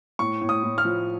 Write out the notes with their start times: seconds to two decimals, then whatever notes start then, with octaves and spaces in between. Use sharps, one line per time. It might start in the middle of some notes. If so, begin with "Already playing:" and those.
0.19 A2 C#6
0.42 A2
0.49 D#6
0.64 A2
0.78 F6
0.85 F3